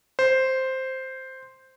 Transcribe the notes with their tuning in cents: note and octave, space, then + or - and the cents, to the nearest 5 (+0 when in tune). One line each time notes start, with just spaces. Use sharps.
C5 +0